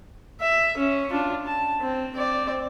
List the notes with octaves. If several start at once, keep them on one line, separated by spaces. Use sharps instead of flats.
E5
C#4
D4 F4
A5
C4
C4 D5